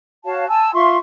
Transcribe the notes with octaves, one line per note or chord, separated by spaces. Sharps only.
F#4 C#5 F5 A5
G#5 A5 E6
F4 E5 C6 C#6